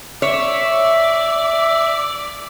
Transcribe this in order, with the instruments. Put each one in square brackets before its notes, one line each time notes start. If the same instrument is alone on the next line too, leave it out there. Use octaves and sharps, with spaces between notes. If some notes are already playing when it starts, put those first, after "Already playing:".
[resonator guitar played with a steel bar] C#5 [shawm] D5 [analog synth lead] E5